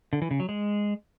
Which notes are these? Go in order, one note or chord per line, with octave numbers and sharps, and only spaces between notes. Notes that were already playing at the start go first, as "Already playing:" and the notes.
D3
E3
C#3
F#3
G#3